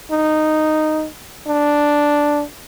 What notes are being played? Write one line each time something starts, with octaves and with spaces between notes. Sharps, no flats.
D#4
D4